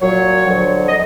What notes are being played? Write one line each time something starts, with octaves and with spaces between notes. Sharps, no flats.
A#2 F#3 C#5
F2 D3 F#3
D#5